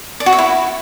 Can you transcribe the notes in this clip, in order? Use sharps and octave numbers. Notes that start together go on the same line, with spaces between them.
D5
F#4
E5
E4